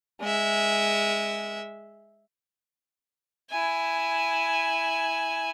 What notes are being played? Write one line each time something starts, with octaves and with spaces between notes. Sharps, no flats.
G#3 E5
E4 G#5